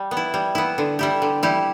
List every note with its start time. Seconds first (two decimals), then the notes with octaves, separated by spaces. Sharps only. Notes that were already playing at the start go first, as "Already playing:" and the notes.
Already playing: G3
0.11 B3
0.17 E4
0.34 G3
0.55 B3 E4
0.78 D3
0.99 G3 E4 G4
1.22 D3
1.43 G3 E4 G4